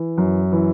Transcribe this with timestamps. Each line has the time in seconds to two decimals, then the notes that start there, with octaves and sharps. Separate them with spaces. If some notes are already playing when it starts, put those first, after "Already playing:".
Already playing: E3
0.18 F#2
0.52 E3